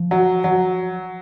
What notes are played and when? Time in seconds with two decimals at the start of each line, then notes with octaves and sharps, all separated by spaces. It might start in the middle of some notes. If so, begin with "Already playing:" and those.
Already playing: F3
0.11 F#3
0.44 F#3